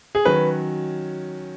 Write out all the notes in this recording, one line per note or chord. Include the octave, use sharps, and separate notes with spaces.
G#4
D#3 F#3 C#4 B4